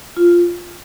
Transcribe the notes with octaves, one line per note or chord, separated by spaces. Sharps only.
F4